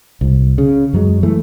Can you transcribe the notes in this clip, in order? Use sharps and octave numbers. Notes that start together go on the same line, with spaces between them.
C2
C#3
F#2 F#3 G#3
E3 A3